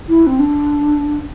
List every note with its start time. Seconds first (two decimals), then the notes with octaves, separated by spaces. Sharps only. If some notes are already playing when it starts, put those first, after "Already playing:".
0.09 E4
0.27 C4
0.39 D4